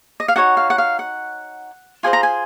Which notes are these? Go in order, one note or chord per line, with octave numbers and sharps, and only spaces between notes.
D#5
F5
D#4 F#4 C#5 F#5
F5
F#5
F5
F#5
F4 G#4 C5 D#5 G#5
A#5
G#5